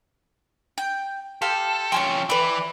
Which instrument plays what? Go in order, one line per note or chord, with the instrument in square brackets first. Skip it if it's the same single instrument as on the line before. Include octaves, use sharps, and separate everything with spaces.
[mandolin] G5
[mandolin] G4 F5 C6 [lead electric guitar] A4
[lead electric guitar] F3 C#4 [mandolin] G5 G#5 C#6
[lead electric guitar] E3 [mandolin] B4 D5